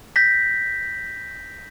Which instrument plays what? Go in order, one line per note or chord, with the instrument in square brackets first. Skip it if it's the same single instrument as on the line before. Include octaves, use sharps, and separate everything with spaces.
[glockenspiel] G6 A#6 B6